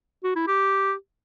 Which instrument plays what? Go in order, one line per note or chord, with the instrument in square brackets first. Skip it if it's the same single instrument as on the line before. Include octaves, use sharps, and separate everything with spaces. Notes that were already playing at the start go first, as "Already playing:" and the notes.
[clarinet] F#4
E4
G4